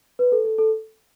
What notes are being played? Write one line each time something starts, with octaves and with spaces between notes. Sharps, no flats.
B4
A4
A4
A4